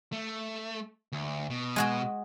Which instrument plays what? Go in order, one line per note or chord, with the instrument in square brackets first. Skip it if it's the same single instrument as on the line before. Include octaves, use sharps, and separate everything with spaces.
[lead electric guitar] A3
D2
B2
[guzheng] G#3 F#4 G#4